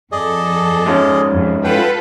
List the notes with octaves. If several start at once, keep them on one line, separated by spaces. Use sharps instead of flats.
F2 G#4 A4 D5 D#5
G#2 G#3 C#4
F2
F4 A4 B4 F#5 G5